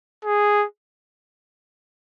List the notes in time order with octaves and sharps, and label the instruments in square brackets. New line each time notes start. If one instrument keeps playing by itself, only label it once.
[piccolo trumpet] G#4